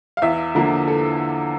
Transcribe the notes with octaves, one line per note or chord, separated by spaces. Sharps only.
F5
E2 E5
D3 F3 A#3
A4